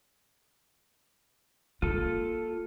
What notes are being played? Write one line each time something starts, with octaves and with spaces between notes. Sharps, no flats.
A#3 F4 A4